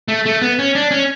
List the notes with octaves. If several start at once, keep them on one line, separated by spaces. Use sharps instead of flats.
A3
A3
B3
C#4
D4
C#4